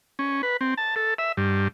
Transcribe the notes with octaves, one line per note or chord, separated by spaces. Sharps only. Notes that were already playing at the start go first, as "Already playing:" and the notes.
C#4
B4
C4
A5
A4
E5
G2